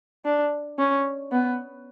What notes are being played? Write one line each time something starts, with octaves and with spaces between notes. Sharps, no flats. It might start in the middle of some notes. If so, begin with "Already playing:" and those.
D4
C#4
B3